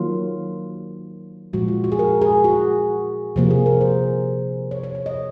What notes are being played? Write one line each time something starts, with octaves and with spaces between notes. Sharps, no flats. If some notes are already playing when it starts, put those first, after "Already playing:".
Already playing: D#3 F#3 A#3 F4
A#2 F3 G#3 F#4
F4
F#4
G#4
A#4
G#4
F#4
C3 F3 A#3
G#4
A#4
C5
C#5
C#5
C#5
D#5